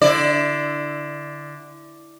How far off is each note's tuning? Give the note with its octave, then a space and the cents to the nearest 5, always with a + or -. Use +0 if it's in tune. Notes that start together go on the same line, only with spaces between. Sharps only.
D3 +0 E4 +0 D5 +20